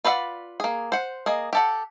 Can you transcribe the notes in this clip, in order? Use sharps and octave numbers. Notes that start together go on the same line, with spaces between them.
F4 B4 D5 E5 F#5
A#3 G#4
C5 F#5
A#3 G#4 D#5
G4 A4 F#5